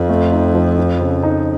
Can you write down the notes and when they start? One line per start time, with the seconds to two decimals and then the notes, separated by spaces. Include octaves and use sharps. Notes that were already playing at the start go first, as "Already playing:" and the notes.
Already playing: F2 F4
0.09 A3
0.32 D#4
0.54 F3
0.78 F3
1.01 C#3
1.23 D#4